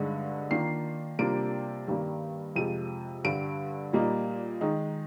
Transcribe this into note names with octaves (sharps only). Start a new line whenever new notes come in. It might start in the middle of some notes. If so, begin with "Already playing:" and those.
Already playing: G2 D3 G#3 D#4
D#3 A#3 D4 F4 C7
C3 G3 A#3 D4 F4 D7
G2 D#3 G3 A#3
F2 C3 F3 G#3 D#7
G2 D3 G3 D7
A#2 G3 A#3 D#4
D#3 G#3 D#4